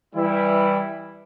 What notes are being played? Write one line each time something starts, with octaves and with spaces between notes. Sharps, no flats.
E3 G3 E4